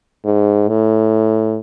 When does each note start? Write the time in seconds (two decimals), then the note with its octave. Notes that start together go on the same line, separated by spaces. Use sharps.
0.25 G#2
0.68 A2